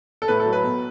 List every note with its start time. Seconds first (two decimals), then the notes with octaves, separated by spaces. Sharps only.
0.22 A4
0.28 A2 B4
0.40 A4
0.46 F#3
0.53 B4
0.63 B2